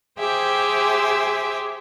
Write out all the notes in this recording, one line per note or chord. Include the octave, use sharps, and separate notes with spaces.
G4 G#4 C5 E5 D6